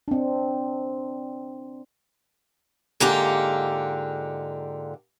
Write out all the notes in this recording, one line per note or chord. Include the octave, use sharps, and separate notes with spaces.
C4 D4
G#2 D3 A#3 F4 G4